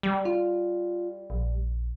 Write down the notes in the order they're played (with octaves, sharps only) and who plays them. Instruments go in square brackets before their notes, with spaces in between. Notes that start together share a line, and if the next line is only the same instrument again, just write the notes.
[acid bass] G3
[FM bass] F4
A#1